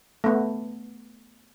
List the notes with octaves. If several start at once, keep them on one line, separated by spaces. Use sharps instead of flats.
A3 B3